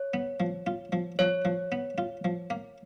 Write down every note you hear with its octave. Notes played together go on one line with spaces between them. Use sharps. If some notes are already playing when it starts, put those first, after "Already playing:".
Already playing: C#5
B3
F3
F4
F3
F3 C#5
F3
B3
F4
F3
A#3